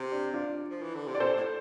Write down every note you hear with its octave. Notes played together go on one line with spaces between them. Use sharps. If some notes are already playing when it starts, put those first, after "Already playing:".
Already playing: C3
D4
D4 F4
F3
E3
D3
C3
D5
A#2 A4 C5
A2